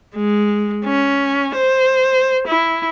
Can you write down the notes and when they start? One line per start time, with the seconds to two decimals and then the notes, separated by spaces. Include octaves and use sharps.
0.15 G#3
0.85 C#4
1.55 C5
2.47 E4